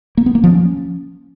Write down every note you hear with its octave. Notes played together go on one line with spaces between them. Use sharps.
A#3
B3
A#3
F3
C#4